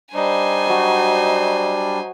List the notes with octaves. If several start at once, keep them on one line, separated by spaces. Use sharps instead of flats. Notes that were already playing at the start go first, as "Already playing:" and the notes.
G3 D4 D#4 C5 G#5
F#3 A5